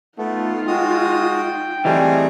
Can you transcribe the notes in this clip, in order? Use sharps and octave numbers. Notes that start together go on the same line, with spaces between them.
A3 B3 D#4 F4
G#3 F#4 G5 D#6
E3 G3 A3 C4 D#4 G#4